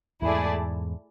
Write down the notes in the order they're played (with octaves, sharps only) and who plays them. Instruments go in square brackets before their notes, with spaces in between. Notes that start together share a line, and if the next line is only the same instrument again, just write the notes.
[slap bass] E2 G#2 [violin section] A3 E4 G#4 D5 A5